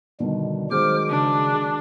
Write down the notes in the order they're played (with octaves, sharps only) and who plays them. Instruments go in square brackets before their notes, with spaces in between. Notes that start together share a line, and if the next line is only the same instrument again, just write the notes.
[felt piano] B2 D3 D#3 [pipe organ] G3
[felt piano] D#3 F#3 G#3 [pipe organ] C5 F6 [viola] D6
[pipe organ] C#3 [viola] D4